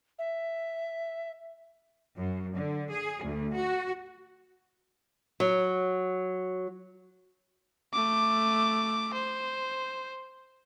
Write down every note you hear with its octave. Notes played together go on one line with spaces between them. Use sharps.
E5
F#2
D3
G#4
D2
F#4
F#3
A3 D6
C5